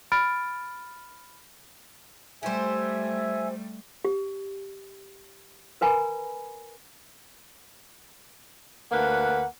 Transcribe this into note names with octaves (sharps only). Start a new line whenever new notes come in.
B5 F6 A6 D7
G3 A3 G4 C5 E5 G#5
G4
A#4 B4 G#5 A#5 B5
D2 A#3 B4 F#5